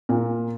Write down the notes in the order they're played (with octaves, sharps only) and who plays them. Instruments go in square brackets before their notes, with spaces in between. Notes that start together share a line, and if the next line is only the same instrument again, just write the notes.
[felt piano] A#2